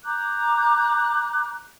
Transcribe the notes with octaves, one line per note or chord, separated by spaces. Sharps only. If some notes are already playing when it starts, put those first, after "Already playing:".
A#5 D6 F#6 G6